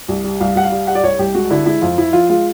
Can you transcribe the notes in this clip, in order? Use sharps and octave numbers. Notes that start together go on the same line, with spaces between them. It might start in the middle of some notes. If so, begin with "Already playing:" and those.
C2
G3
C2 F5
C2 F#5
F5
G3
G3 F#5
D5
C2 C#5
C2 G4
G#3 F#4
D3 E4
G#3 E4
F2 F4
F3 E4
F3 F4
G#3 F4